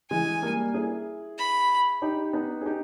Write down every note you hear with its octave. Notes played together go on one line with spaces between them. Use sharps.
E3 G#3 G#5
G3 A#3
E4 G#4
B5
D#4 G4
B3 D#4
G#4
D#4 G4